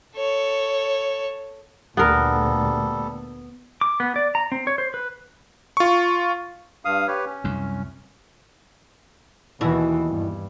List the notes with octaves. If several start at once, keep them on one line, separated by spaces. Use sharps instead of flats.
A4 C#5
D2 A#2 G3 B3 A4 A#4
D6
B3
D5
A#5
C4
C#5
C5
B4
F4 C#6
G2 F5 D#6
G4 B4 C#5
C#4
C2 F#2
D#2 B2 E3 E4 F#4
G2